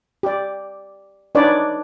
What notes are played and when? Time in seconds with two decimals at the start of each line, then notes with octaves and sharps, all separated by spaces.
0.23 G4 D5
1.35 D4 D#4 B4 C#5 D5